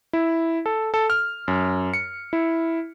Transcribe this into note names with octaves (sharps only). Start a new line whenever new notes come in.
E4
A4
A4
F6
F#2
C#7
E4